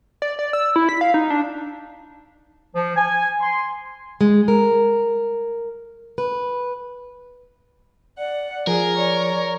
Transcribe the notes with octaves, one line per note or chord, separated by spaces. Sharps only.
D5
D5
E6
E4
B6
F5
D#4
D4
F3
G#5
C6
G#3
A#4
B4
D5 F#5
F3 G#4 A#4
C#5 D5